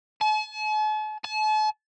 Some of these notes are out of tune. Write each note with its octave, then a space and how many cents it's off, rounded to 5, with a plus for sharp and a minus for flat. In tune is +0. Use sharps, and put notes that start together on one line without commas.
A5 -45
A5 -40